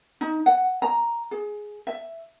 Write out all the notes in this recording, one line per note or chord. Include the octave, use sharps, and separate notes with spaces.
D#4
F#5
A#5
G#4
E5